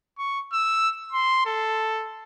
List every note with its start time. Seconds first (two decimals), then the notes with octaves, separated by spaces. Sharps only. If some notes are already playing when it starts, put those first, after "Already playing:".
0.18 C#6
0.53 E6
1.12 C6
1.46 A4